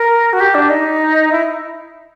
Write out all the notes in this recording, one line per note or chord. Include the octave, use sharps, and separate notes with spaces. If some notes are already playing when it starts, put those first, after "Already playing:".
Already playing: A#4
F#4
G4
D4
D#4
E4